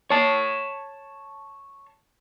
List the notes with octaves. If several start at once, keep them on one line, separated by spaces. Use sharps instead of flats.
C#5 A5